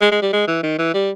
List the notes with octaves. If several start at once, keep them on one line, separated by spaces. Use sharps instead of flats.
G#3
G#3
G3
G#3
E3
D#3
E3
G3